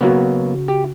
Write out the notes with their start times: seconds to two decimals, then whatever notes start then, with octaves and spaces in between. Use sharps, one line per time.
0.01 C#3 F#3 A#3 B3 F#4
0.68 G4